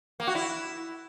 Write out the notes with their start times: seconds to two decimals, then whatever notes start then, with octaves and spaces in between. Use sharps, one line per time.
0.20 A#3
0.27 F#4
0.35 E4